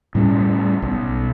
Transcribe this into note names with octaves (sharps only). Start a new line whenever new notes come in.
A2 G3 C#4
B1